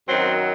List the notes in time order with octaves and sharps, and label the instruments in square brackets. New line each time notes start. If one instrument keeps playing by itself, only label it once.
[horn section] F#2 D#3 F#3 C4